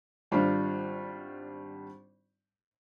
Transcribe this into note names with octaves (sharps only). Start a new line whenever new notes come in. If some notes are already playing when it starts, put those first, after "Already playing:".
G#1 G3 D4 F4